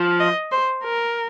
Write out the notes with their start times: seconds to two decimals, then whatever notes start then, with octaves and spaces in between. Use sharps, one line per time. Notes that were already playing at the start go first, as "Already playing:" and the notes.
Already playing: F3
0.19 D#5
0.52 C5
0.84 A#4